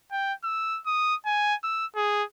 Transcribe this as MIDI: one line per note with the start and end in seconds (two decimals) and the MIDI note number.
0.11 0.33 79
0.44 0.80 88
0.86 1.15 87
1.25 1.54 80
1.64 1.86 88
1.95 2.23 68